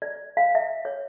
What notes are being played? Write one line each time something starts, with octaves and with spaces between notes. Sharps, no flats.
D5
F5
E5
C#5